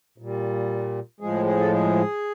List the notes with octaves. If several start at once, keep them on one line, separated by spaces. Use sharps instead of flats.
A#2 G3
A2 F3 G#3 G#4
G#4
A4
G#4